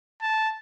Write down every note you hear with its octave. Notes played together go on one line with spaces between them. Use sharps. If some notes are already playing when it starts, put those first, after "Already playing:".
A5